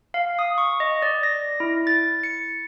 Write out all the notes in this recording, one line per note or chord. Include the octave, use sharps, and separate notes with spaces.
F5
D#6
C#6
D#5
D5
A#6
E4
A6
C#7